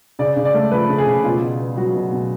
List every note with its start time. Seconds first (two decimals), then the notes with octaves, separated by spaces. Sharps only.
0.19 C#3 D5
0.36 C#3
0.45 D5
0.54 A3
0.71 F3 B4
0.89 C#3
0.98 G#4
1.07 C#3
1.24 B2 F4
1.42 B2
1.60 B3
1.77 F#3 F#4
1.95 B2
2.13 B2